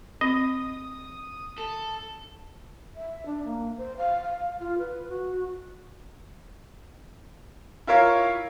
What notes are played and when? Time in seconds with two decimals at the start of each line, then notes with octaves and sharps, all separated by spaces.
0.21 C4 D#5 D#6
1.58 A4
2.96 E5
3.26 D4
3.44 A#3
3.77 C5
3.97 F5
4.24 F5
4.59 F4
4.78 B4
5.08 F#4
7.87 E4 F4 A#4 C#5 F5